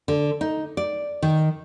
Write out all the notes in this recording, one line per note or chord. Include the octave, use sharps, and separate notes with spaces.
D3
D#4
D5
D#3